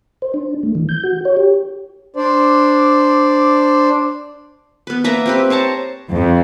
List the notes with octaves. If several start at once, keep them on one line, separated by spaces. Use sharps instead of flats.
C5
D4
A3
E3
G6
F#4
C#5
G4
D4 C5 D5
B3 B4
A#3 B4 E5 A#5
C4 G4 B4
C5 C#5 A5 A#5
F2